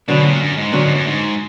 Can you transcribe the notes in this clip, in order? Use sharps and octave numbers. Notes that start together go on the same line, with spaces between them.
B2 D3 F#3 B3 D4
G#2
A#2
F#2
G#2
A#2 D3 F#3 B3 D4
G#2
F#2
G#2